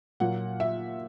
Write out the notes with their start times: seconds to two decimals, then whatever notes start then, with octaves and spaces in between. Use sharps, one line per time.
0.20 A#2 F#3 A#3 F#5
0.60 E5